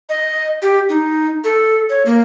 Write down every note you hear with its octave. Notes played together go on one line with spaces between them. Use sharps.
D#5
G4
D#4
A4
C#5
A#3